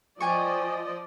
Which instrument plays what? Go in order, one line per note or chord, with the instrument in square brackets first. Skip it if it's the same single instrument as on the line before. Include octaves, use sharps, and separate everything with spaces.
[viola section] F3 D5 D#5 [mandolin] G5 G#5 C#6